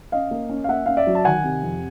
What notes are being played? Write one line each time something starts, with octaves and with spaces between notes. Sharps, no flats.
C#4 D#5 F5
A#3
C#4
F5
A#3 E5 F#5
C#4 F5
D5 E5
F#3
A5
D#3 F#5 G#5
C3
F2